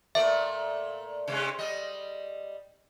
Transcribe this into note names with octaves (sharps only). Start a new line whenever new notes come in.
A#2 A3 D5 E5
C3 G#3 C#4
G3 D#5